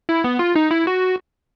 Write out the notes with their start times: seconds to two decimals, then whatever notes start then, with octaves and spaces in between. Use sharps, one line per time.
0.09 E4
0.24 B3
0.39 F4
0.56 D#4
0.71 E4
0.87 F#4